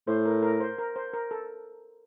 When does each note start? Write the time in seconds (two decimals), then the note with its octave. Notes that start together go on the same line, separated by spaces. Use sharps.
0.07 A2 C5
0.25 A#4
0.43 A#4
0.60 C5
0.78 A#4
0.96 C5
1.14 A#4
1.31 A4